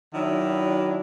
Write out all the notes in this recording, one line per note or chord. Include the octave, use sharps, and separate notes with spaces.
D#3 F#3 D4 E4